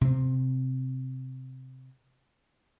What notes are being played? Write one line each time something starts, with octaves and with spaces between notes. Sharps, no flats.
C3 C4